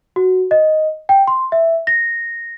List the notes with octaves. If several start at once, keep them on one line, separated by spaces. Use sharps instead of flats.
F#4
D#5
G5
C6
E5
A#6